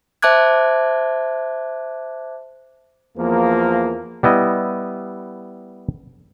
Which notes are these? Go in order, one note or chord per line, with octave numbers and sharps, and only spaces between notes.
C5 E5 A5 D6 F#6 G#6
E2 F3 A#3
G3 B3 E4 D#5